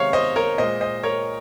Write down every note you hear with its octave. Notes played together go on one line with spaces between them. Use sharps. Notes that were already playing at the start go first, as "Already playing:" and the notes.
Already playing: C3 D#3 G#3 C5 C#5 F5
C5 D#5
A#4 C#5
A#2 G#3 C5 D#5
C5 D#5
A#4 C#5